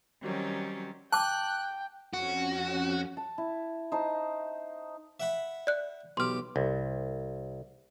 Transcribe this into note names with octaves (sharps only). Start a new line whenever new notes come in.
D#3 F#3 G3 C4 C#4
G5 A5 D6 F#6
F2 C#4 F#4
A5
E4
D#4 C5 A5
E5 F#5 B5
D5 F#6
B1 G4 C6 F6
C2